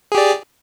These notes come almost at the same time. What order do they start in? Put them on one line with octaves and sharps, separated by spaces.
G#4 G4 D5